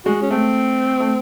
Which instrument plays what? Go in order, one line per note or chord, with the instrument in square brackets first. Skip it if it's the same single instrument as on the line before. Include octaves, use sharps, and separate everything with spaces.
[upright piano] G#3 [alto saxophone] F#4
[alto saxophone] C#4
[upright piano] A3 [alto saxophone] C4
[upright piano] A3